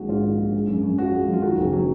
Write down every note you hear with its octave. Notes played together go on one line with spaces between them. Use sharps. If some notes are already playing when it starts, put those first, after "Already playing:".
Already playing: A#1 D#3 G#3 F#4
G#2 F4
D#3
A#1
G#3
F#2
F#2
F3 F#4
G#3
F#2 F4
D#3 F#4
F#1
F#3